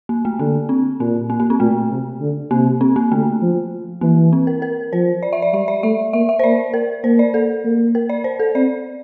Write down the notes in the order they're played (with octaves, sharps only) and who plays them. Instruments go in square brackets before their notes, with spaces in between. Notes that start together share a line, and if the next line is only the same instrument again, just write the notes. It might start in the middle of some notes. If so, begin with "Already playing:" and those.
[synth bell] A#3
A3
[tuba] D3 [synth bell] A#3
[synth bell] C4
[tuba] A#2 [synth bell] A#3
[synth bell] A#3
A#3
C4
[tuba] A#2 [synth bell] A3
[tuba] C3
D3
[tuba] C3 [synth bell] A#3
[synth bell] C4
A#3
[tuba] D3 [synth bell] A3
[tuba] F3
[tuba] E3 [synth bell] A#3
[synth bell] C4
A#4
A#4
[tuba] F3 [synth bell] C5
[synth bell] D5
E5
D5
[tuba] G3 [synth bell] E5
[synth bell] D5
[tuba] A3 [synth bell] E5
[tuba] A#3 [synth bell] E5
[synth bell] E5
C5
[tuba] A#3 [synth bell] D5
[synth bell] A#4
[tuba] A#3 [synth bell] C5
[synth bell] D5
A4
[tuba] A#3
[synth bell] A#4
D5
C5
A4
[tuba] C4 [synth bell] D5